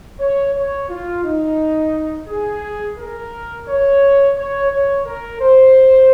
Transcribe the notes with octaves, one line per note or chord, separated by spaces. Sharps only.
C#5
C#5
F4
D#4
G#4
A#4
C#5
C#5
C#5
A#4
C5